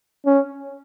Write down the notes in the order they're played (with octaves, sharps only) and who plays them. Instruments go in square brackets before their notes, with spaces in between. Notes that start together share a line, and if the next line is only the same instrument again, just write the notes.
[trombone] C#4